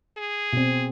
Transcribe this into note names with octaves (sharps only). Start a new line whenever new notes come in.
G#4
B2 C4